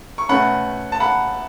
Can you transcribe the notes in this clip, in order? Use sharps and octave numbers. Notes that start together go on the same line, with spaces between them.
C#6
B2 A3 C#4 F#5 B5
A5
F#5 B5